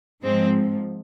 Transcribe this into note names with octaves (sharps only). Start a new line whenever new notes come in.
G#2 F3 G#3 C4